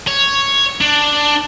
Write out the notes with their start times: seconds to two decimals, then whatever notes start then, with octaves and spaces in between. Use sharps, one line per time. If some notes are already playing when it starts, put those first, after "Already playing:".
0.07 C#5
0.81 D4